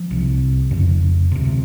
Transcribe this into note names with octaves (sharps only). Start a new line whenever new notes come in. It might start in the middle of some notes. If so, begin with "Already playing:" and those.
Already playing: F3
C2 C3
F1 F2 C#3
D2 C3